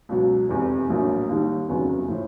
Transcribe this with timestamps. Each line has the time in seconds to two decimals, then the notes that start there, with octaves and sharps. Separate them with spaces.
0.09 C#2 B2 F#3
0.49 F1 E2 C3
0.88 A#1 A2 F#3 A#3
1.29 D#2 D#3 G3
1.69 F1 E2 C#3 F#3 B3
2.08 A2 F3